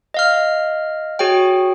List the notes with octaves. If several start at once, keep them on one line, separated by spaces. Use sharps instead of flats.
D#5 F5 F6
F#4 G#4 C#5 G5